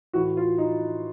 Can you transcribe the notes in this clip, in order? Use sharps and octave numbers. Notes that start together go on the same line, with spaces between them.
A2 E3 F#4
F4
D#4